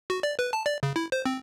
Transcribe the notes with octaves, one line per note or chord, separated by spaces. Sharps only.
F#4
D5
B4
A5
D5
C#3
E4
C5
C4